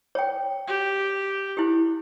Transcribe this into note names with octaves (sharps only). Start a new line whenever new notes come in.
C#5 G5
G4
E4 G4